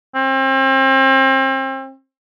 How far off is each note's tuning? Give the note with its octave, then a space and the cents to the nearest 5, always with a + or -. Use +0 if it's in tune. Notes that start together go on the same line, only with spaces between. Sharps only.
C4 +35